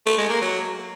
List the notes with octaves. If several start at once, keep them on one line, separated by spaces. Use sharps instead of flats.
A3
G#3
A#3
F#3